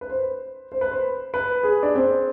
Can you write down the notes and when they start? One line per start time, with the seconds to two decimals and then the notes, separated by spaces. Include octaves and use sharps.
0.01 B4
0.10 C5
0.72 C5
0.81 B4
0.91 C5
1.34 B4
1.63 G#4
1.83 D4
1.95 C4